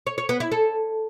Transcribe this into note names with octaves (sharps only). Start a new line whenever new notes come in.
C#5
C#5
B3
E4
A4